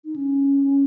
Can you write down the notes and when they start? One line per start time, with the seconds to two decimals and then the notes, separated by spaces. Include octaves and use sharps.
0.05 D#4
0.16 C#4